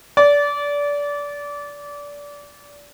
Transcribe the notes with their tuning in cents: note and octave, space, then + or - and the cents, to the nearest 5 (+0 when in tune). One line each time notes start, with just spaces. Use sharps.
D5 -25